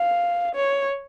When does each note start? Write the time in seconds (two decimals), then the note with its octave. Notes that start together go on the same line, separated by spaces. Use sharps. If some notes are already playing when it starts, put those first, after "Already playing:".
Already playing: F5
0.56 C#5